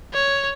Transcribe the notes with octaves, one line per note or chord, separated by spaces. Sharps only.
C#5